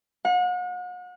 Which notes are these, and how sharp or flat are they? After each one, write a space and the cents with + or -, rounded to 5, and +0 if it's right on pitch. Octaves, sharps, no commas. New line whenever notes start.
F#5 -40